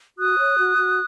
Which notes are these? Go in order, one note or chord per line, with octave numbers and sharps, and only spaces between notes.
F#4 D#6 F#6
C#5
F#4
F#4